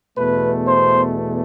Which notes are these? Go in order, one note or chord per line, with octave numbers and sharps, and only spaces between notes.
E2 B2 A3 B4
C5